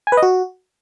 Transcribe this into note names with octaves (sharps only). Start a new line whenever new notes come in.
G#5
B4
D#5
F#4